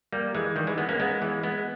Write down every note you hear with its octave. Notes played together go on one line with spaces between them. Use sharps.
G3 A#3
E3 G#3
D#3 G3
E3 G#3
G#3 B3
A#3 C#4
G#3 B3
E3 G#3
G#3 B3